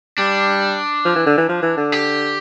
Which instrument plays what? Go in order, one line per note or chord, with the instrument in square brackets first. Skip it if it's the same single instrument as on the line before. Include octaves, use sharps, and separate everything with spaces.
[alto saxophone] G3 [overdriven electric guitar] D4
[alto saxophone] F3
E3
D3
E3
F3
E3
D3
[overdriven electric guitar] G4